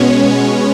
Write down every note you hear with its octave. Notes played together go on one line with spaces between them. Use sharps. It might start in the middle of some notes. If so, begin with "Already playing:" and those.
Already playing: B2 G#3 B3 C#4 C#5